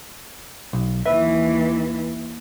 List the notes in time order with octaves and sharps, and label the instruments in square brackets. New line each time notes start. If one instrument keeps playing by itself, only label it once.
[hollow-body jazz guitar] B1
[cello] D#2 E3 [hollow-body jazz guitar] B4 E5